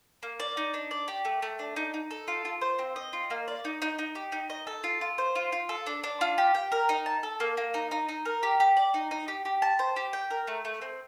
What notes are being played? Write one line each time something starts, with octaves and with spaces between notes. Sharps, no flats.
A#3
D5
D#4
D4
D5
G4
A3
A3
D4
D#4
D#4
A4
F4
F4
C5
C4
D#5
F4
A#3
D5
D#4
D#4
D#4
G4
D#4
D#5
A4
F4
F4
C5
F4
F4
A4
D4
D4
F4
G4
G5
A#4
D#4
A5
A4
A#3
A#3
D#4
D#4
D#4
A#4
G4
G4
D5
D#4
D#4
G4
G4
A5
C5
G4
G5
A#4
A3
A3
C4